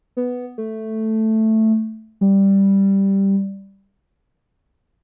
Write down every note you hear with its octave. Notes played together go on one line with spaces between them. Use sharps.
B3
A3
G3